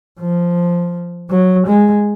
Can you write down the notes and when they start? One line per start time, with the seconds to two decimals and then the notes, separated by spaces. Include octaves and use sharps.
0.20 F3
1.30 F#3
1.67 G#3